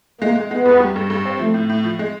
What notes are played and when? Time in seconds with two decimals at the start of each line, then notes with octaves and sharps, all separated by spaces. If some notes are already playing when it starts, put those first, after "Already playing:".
0.21 G#3 A#3
0.36 G#3
0.51 G#3 B3
0.65 E2
0.80 G3
0.96 G2
1.10 G2
1.25 C4
1.39 F3 A3
1.54 A2
1.69 A2
1.84 F3
1.99 G#3